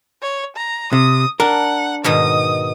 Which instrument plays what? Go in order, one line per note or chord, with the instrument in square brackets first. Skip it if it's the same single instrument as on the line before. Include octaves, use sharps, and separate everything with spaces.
[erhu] C#5
A#5
[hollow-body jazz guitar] C3 [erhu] D#6
[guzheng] D4 [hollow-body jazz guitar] A#4 [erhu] F#5
[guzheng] G#2 B2 D#3 [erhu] D#6